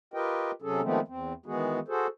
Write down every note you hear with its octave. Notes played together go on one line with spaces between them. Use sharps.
F4 G4 A#4 B4 D#5 G5
C3 F#3 C#4 G#4 A4
D#3 F3 G#3 A3 B3 C4
E2 C4
D#3 E3 G#3 B3 F#4 G#4
F#4 G#4 A4 C5